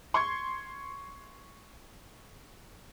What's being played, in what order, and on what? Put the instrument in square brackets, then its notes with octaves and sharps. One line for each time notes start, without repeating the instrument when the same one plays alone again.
[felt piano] C6 C#6 G#6